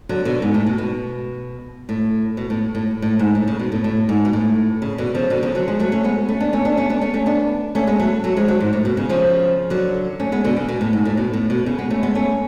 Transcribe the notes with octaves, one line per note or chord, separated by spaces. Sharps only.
D3 F#3
B2 D3
G#2
A2
B2
B2
A2
B2
A2
A2
A2
G#2
A2
C#3
B2
A2
A2
G#2
B2
A2
C#3
B2 D3
C#3 F3
B2 D3
C#3 F3
D3 F#3
F3 G#3
F#3 A3
A3 C#4
G#3 B3
A3 C#4
B3 D4
A3 C#4
B3 D4
A3 C#4
B3 D4
A3 C#4
A3 C#4
B3 D4
A3 C#4
G#3 B3
F#3 A3
F#3 A3
F3 G#3
D3 F#3
G#2
A2
B2
C#3
C#3 F3
D3 F#3
A3 C#4
G#3 B3
B2 D3
C#3
B2
A2
G#2
A2
B2
A2
B2
C#3
G#3 B3
A3 C#4
G#3 B3
A3 C#4